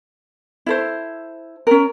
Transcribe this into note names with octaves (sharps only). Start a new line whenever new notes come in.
E4 A4 C5
C#4 A#4